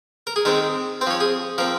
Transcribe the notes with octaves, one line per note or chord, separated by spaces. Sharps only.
A#4
G#4
D#3 G#3 C4 A#4
C4 C5
F3 C#5
G#4
F3 C4 A#4